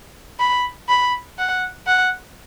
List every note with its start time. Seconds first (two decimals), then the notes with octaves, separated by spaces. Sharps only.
0.40 B5
0.89 B5
1.38 F#5
1.87 F#5